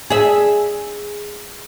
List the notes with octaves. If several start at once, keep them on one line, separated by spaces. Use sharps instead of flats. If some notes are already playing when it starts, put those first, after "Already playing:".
G#4 E5